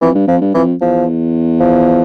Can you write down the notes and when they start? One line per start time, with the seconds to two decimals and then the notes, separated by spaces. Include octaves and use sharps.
0.01 F2 E3
0.15 G2
0.27 F2 F3
0.41 G2
0.54 F2 E3
0.81 E2 F3
1.60 F3